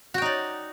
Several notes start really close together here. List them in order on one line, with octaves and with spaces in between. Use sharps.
F#4 G5 D#4 D5